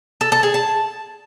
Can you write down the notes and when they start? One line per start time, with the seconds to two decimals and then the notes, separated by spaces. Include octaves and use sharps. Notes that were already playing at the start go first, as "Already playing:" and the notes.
0.21 A4
0.32 A4
0.43 G#4
0.54 A5